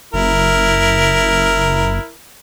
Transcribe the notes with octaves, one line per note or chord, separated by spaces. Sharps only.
F#1 E4 A#4